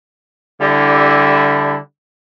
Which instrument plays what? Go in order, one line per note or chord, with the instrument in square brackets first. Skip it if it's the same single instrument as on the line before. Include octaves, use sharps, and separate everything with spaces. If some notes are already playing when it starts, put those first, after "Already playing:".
[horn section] D3 G3 E4